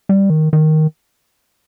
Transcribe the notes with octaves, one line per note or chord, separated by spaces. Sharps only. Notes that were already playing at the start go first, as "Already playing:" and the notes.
G3
D#3
D#3